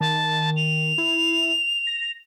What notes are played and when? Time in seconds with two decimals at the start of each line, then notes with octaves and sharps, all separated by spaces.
0.01 D#3 A5
0.56 F7
0.98 E4
1.87 A#6